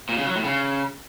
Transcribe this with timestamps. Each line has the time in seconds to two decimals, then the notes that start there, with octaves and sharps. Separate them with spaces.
0.09 A#2
0.18 C#3
0.27 F#3
0.36 A2
0.45 C#3